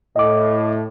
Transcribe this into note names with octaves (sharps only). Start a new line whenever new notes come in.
A2 D#5 D6